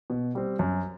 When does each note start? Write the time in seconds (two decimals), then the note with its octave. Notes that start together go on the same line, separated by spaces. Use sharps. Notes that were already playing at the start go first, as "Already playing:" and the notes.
0.10 B2
0.35 G3 C4
0.59 F#2